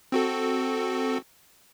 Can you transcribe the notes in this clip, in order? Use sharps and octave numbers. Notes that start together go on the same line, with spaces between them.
C4 F#4 A4